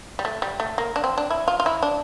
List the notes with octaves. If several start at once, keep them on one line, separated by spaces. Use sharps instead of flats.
G3
A3
G3
A3
A#3
D4
C4
D4
E4
F4
F4
E4
D4